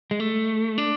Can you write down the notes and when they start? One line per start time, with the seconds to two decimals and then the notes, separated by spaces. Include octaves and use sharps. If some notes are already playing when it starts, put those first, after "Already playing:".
0.11 G#3
0.20 A3
0.78 D4